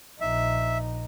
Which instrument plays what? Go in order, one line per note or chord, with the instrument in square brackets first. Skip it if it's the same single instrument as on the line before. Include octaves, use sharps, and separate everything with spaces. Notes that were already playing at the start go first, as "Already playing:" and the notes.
[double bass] A#1 D#4 [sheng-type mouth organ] E5